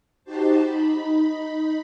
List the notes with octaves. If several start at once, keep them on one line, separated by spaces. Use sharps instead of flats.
D#4 F#4 G4 C5 A5
D#4 B5